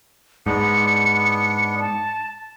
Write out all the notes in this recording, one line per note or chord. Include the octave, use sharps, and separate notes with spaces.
G#2 B3 D4 C#7
A5